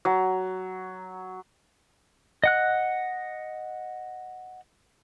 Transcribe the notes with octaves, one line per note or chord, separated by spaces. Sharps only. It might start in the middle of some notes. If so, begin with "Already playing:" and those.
F#3
D#5 F#5 F#6